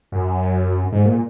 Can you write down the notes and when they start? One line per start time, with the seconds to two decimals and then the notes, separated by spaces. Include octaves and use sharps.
0.12 F#2
0.92 G#2
1.05 A#2